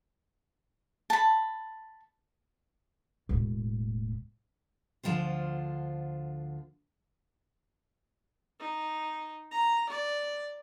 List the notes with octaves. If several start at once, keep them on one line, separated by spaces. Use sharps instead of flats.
A5 B5
E1 A2
D2 D3 F3 G#3 F4 C5
D#4
A#5
D5